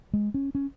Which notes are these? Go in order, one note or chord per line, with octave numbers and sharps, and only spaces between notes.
G#3
C#4
C#4